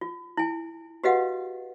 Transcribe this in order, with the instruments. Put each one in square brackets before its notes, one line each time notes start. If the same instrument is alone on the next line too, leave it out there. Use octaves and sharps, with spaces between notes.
[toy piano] F4
E4 G#5
F#4 G4 B4 D#5 F5 F#5